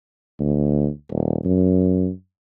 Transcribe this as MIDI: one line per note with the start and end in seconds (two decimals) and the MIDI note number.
0.39 0.89 38
1.10 1.38 27
1.45 2.09 42